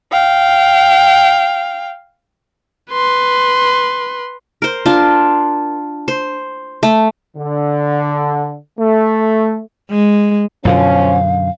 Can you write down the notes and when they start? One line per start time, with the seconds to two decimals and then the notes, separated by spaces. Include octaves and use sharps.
0.12 F5 G5
2.92 B4 C6
4.62 A#4 C5
4.86 D4 F4
6.08 C5
6.83 A3
7.37 D3
8.79 A3
9.90 G#3
10.65 F#2 B2 D3 F3 C#4 F5